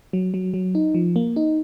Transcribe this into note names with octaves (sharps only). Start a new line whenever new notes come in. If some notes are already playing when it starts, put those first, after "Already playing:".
F#3
F#3
F#3
D#4
F3
A#3
D#4